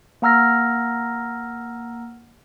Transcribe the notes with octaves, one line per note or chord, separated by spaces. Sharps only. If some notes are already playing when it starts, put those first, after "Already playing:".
A#3 F#5 A#5 E6 F6 A#6